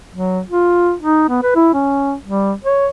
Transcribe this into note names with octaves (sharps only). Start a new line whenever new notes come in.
F#3
F4
D#4
B3
B4
E4
C#4
G3
C#5